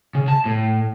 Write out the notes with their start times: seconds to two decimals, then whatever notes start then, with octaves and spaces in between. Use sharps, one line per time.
0.15 C#3
0.28 A5
0.45 A2